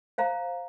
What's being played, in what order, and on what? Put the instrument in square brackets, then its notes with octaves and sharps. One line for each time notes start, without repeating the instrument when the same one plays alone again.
[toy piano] C5 F5 A#5